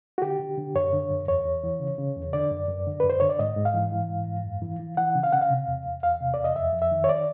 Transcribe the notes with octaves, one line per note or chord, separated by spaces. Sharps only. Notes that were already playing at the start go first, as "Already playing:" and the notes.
F#4
D3 G4
D3
D3
F#2 C#5
D3
F#2
E2 C#5
E2
E3
C#3
C#3
E2
D3 D5
F#2
F#2
D3
F#2 B4
C5
D3 C#5
D5
G#2 D#5
G#2
F5
E3
E3
G#2
G#2
F#2
E3
E3
E3 F#5
C#3
F5
C#3 F#5
F5
C3
E2
E2
E2 F5
C3
E2 D5
D#5
F2 E5
F2
E5
D#3
C#5
D5